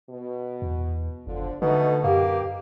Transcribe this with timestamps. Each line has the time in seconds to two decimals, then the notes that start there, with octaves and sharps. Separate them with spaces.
0.10 B2
0.62 E2
1.27 F#1 D3 F3
1.62 B2 D3 A3 D#4
2.04 F#2 A#3 G4